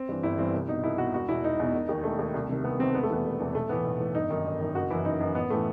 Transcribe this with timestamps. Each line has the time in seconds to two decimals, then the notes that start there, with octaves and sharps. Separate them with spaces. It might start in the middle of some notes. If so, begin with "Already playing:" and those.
Already playing: C4
0.09 G2 E3
0.23 G1 E4
0.38 G2 E3 C4
0.54 C2
0.69 B2 D#4
0.83 C2 E4
0.98 B2 F#4
1.14 E1 F#4
1.29 E2 B2 E4
1.44 E1 D#4
1.59 E2 B2
1.74 E1
1.89 D#2 D#3
2.04 E1 A3
2.19 D#2 D#3
2.34 C2
2.49 C3 D#3
2.64 C2 B3
2.79 C3 D#3 C4
2.94 E1 B3
3.03 A3
3.10 E2 C3 E3 B3
3.25 E1
3.40 E2 C3 E3
3.55 B1 A3
3.69 A2 E3 B3
3.85 B1
3.99 A2 E3
4.15 G1 D#4
4.30 F#2 D#3
4.45 G1
4.60 F#2 D#3
4.75 F#1 F#4
4.90 F#2 E3 E4
5.05 F#1 D#4
5.20 F#2 E3
5.35 A1 B3
5.50 A2 E3 A3